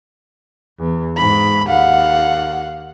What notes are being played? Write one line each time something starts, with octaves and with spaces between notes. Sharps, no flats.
E2
G#2 B5
D#2 F5 F#5